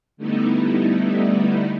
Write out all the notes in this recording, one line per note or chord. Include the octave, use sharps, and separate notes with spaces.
D3 G3 A3 B3 D#4 E4